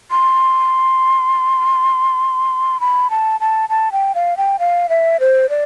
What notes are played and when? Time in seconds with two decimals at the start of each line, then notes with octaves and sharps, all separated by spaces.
0.11 C6
2.80 B5
3.10 A5
3.41 A5
3.69 A5
3.92 G5
4.15 F5
4.37 G5
4.59 F5
4.89 E5
5.20 C5
5.49 D5